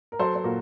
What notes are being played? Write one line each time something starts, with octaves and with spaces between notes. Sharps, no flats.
A#4
F#3 A4 C5
C5
A#2 F#4 A#4